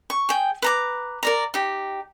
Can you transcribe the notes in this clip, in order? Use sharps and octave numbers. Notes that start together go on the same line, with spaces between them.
C#6
G#4 G5
B4 A#5 D6
A#4 D5 A#5
D#4 G4